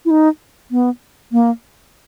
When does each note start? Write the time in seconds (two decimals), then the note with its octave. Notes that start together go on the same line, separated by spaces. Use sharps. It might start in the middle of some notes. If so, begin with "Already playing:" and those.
0.05 E4
0.10 D#4
0.71 B3
1.32 A#3